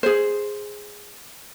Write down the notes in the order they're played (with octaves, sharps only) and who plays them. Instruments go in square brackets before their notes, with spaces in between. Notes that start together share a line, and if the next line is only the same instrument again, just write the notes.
[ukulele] G#4 C5